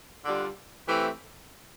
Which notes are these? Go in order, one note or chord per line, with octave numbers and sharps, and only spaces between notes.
D3 G3 D4 F4
E3 A3 C4 G4